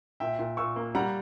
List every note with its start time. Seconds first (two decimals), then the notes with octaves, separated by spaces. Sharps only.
0.20 A#2 E5 G5
0.39 A#2
0.57 A#2 C#6 E6
0.76 A#3
0.95 G3 F#5 A#5